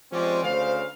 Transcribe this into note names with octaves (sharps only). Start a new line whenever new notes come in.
F3 G#3 C4 C#4 G4 D5
D2 C#3 C5 F5